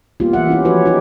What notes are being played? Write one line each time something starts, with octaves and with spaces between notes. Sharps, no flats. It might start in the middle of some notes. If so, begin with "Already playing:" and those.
G3 A#3 B3 F4 G4
E3 E5 F#5
C#4 E4 G4
F3 E4 F#4 B4 C#5
D#4 E4 G4